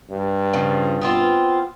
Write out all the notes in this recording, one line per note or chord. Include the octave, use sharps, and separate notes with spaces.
G2
C#3 F3
B3 C4 F4